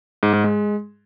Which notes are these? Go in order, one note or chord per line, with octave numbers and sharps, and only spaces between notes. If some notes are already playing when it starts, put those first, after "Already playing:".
G#2
G#2
G#3